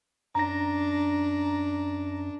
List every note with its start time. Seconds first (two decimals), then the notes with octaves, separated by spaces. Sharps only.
0.35 F#2 D4 A#5 A#6